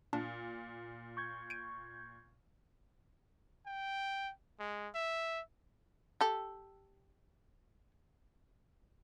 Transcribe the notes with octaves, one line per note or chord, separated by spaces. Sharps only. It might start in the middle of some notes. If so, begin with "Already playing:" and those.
A#2 D4
C#6 G6 G#6
D7 D#7
G5
G#3
E5
G4 A4